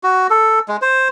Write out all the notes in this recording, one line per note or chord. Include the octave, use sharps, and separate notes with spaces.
F#4
A4
G#3
C5